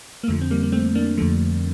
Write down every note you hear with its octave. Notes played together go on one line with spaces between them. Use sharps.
A#3
F2 D3 F3 A3
C4
G3 A#3
A#3
A3 C4
A#3 D4
F2 D3 F3 A3